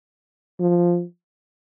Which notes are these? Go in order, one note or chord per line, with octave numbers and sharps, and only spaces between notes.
F3